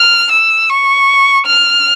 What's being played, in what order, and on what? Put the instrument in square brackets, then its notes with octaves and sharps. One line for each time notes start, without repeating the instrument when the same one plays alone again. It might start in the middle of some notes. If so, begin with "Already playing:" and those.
Already playing: [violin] F6
E6
C#6
F6